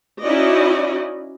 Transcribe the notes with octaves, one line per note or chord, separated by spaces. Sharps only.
C#4 D#4 E4 F#4 D5 D#5